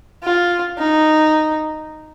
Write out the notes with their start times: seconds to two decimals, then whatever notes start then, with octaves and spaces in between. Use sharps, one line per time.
0.23 F4
0.78 D#4